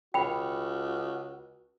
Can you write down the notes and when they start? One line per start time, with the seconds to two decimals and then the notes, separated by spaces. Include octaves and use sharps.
0.14 C#2 F#4 G5 B5